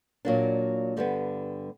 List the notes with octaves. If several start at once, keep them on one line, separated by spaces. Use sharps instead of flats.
A#2 F#3 A#3 D4
G2 D3 G3 B3